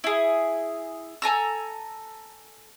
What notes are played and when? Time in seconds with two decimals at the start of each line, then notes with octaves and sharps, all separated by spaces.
0.04 E4 G#4
1.22 A4 G#5 A#5 E6